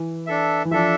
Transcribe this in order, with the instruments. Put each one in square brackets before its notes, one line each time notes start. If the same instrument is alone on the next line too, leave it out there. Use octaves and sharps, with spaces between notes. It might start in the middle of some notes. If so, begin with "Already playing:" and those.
Already playing: [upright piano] E3
[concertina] D4 A4 E5
[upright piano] E3
[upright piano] F3 [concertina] D4 A4 E5